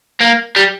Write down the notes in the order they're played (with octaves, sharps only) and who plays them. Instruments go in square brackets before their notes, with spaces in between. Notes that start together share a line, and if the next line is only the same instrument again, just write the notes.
[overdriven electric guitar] A#3
G3